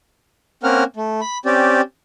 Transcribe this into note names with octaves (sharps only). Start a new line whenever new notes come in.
A#3 C4 C#4 A#4 F#5 F6
A3
B5
C4 C#4 G4 D5